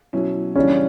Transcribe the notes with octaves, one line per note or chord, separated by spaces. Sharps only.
B2 F#3 C#4 E4
C#3 E3 G3 C#4 D4